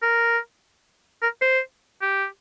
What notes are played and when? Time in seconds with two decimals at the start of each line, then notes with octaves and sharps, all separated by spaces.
0.03 A#4
1.22 A#4
1.42 C5
2.02 G4